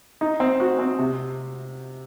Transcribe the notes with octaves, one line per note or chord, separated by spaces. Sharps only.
D#4
C4
F#4
C4
C3